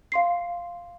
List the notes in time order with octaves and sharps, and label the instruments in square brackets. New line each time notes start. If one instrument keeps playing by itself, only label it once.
[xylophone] F5 C6 C7